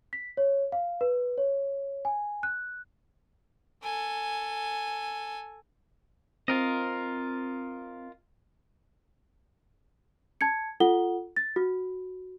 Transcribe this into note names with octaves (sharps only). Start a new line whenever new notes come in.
B6
C#5
F5
B4
C#5
G#5
F#6
A4 G#5
C4 F4 A#4 D#5
A5 G#6 C#7
F4 A4 F#5 G7
A6
F#4